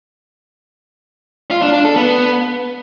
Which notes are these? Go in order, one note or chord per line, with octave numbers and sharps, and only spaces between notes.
F4
D4
D4
A4
B3